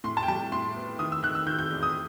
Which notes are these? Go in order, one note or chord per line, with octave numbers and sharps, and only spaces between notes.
A2 C6
A5
G5
G3 A5
A2 C6
B3
D#3 D#6
E6
D#3 F#6
E6
D#3 G6
G6
E2
D#6